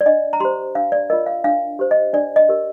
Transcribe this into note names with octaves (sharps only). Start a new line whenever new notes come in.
D5
D4 D#5
A#5
G4 C5 C6
D4 F5
D5
F4 A#4 D#5
F5
D4 F5
G4 C5
D#5
D4 D5
D#5
G4 A#4